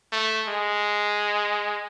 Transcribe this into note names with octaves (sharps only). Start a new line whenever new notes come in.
A3
G#3